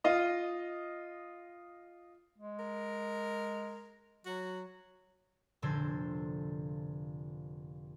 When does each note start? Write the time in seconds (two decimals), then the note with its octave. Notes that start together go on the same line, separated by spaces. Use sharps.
0.04 F4 D#5 D#6
2.38 G#3
2.59 A#4
4.26 F#3 F#4
5.62 F1 A#2 D3 A4 C5 G#6